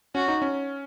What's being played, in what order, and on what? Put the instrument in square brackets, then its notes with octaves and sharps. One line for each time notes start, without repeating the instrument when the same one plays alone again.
[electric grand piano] C#4 [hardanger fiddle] F#4
[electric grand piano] D#4
C#4